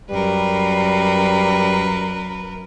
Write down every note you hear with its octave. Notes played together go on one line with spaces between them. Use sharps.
F#2 G3 A#4 B4